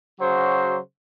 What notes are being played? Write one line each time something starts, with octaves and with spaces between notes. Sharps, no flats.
C#3 F#3 F#4 C5